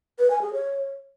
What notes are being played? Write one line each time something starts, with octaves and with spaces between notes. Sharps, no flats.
B4
G#5
G#4
C#5